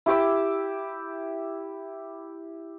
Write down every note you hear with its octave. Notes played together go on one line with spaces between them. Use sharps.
E4 G4 D6 E6